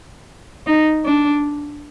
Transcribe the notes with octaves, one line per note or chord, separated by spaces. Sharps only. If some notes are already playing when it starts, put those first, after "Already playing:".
D#4
D4